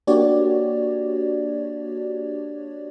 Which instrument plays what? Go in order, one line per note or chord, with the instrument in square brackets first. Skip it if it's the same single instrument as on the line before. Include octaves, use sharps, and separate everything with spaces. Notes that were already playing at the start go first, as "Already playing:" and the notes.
[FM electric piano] A#3 D4 F#4 G4 C#5 D5